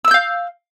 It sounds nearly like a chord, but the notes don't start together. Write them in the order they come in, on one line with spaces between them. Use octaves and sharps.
E6 E5 G6 F5